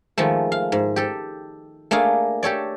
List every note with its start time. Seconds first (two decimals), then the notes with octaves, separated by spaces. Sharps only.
0.18 D#3 F3 G#3 A3
0.52 F5
0.72 G#2
0.96 G4 A4
1.91 A3 A#3 D4 G#4 F5
2.43 G4 A4 C#5 D5